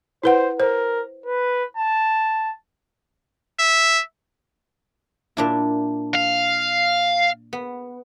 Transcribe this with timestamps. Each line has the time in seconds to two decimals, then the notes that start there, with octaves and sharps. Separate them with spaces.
0.24 E4 B4 C5 F#5
0.60 A#4 C5
1.26 B4
1.77 A5
3.60 E5
5.37 A#2 D4 E4
6.14 F5
7.53 B3